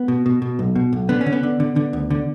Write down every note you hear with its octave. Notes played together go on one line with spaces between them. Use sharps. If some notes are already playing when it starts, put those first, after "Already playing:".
Already playing: B3
B2
B2
B2
B1
B2
B1
D3 B3
C#4
D3
B3
D3
D3
D3
D2
D3